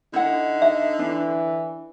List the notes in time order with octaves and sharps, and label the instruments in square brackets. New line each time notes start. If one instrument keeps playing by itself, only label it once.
[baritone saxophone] D3 [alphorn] D#4 [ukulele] E4 F#5
[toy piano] E5
[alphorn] E3 [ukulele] D4